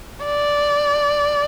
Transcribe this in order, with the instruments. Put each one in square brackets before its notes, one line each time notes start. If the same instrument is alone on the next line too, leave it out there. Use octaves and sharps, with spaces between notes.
[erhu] D5